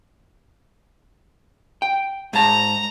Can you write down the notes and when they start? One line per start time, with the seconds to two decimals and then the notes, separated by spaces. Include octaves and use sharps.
1.82 G5
2.33 G#2 A5 A#5